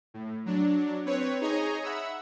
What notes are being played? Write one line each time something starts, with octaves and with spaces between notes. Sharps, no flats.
A2
F#3 D4
C4 B4 C#5
D#4 G#4 C#5 D#5 G#5 A#5
E5 F#5 B5 E6